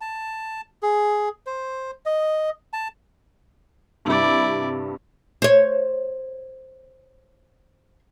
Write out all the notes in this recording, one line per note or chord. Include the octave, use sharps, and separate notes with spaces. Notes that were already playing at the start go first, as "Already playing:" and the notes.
A5
G#4
C5
D#5
A5
G2 C3 G3 E4 D5
C5 C#5